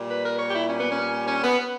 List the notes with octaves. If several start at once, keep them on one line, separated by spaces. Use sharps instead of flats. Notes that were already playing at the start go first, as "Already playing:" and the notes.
Already playing: A#2 G3
B4
A#4
C#5
G4
E4
C#4
B3
C#4
C#4
B3